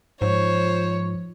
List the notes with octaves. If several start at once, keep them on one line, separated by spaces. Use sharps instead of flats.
G#2 F3 C5 C#5